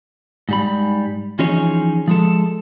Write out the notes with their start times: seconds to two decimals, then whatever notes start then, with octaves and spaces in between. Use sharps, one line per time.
0.49 G#2 G3 B5
1.39 E3 F3 C#4 D#4 G#4 C#5
2.08 F3 G#3 A4